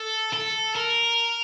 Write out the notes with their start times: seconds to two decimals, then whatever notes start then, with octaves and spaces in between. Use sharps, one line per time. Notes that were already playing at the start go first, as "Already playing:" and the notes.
Already playing: A4
0.33 A4
0.76 A#4